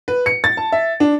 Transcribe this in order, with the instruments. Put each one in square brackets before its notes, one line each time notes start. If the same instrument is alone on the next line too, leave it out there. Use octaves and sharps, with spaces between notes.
[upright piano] B4
C#7
A6
A5
E5
D4